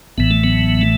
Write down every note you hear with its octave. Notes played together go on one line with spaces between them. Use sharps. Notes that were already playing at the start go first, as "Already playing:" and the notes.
A1 A2 E3 B3
A3
F#3 B3
A3